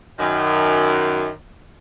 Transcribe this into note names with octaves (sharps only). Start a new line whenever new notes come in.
F#2 D#3